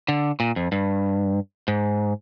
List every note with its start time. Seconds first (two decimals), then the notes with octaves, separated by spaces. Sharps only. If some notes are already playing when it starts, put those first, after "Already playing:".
0.08 D3
0.40 A#2
0.56 F2
0.72 G2
1.68 G#2